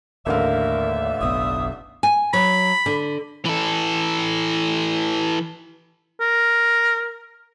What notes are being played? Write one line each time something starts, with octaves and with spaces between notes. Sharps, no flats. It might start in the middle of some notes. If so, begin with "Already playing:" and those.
A1 D#2 D3 A#4 D5 E5 F5
F#1 B1 B3 D#6
G#5
F#3 B5
D3
E3 A4
A#4